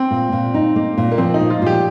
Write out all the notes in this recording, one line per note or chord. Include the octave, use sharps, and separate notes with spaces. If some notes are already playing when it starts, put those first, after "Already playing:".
Already playing: C4
A#2
A#2
D#4
A#3
A#2
A#3
F3 C4
D#4
A#2
F4
A#2 G4